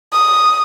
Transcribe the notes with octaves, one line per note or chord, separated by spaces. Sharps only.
D#6